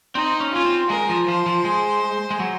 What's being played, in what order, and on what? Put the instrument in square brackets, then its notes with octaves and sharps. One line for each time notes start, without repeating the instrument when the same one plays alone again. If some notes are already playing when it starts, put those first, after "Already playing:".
[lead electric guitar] C4 [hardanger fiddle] D#4
[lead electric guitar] C#4
[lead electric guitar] C#4 [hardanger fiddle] F4
[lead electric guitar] C4
[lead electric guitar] G#3 [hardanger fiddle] A#4
[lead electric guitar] F3
[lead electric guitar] F3 [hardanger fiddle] C5
[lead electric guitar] F3
G#3
G#3
F#3